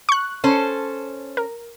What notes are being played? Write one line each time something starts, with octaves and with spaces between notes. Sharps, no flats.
C#6 F#6
C#4 A4 C5
A#4